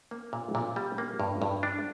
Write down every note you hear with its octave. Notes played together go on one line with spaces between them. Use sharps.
A#3
A#2
A#2
G3
A#3
G2
G2
D4